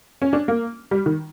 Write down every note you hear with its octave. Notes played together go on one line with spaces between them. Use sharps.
C#4
D4
A#3
G3
D#3